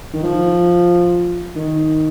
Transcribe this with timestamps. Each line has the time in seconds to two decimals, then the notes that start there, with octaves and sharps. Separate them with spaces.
0.13 D#3
0.23 F3
1.56 D#3